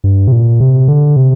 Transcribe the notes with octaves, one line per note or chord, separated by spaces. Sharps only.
G2
C3
A#2
C3
D3
C3